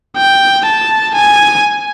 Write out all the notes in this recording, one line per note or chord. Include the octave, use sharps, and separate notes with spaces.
G5
A5
G#5